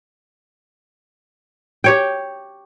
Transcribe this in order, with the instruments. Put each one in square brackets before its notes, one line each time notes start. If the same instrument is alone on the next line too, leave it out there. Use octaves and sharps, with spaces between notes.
[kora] G4 C#5 G5